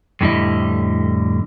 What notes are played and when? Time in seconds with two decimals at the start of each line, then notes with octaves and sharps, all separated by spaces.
0.21 F2 A2 D3 G3 E4 D#5